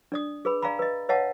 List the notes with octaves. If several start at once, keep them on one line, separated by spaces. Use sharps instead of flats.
D4 D5 D#6
G#4 B4 B5
D5 F5 G#5 A#5 B5
B4 D#5
B4 C#5 D#5 F5 F#5 A5